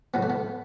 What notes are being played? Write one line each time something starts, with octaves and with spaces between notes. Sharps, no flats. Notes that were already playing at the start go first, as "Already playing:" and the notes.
A2 F#3 B3
A3
B3